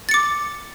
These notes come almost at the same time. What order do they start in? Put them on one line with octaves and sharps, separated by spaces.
A6 C#7 D6